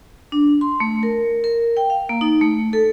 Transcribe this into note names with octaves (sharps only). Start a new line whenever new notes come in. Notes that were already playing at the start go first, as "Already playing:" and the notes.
D4
C6
A3
A#4
A#4
G5
F5
A#3
D#4
A3
A4